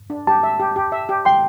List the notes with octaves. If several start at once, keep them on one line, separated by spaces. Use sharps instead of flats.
D4
G4 A5
E5
G4
G4
E5
G4
G5 C6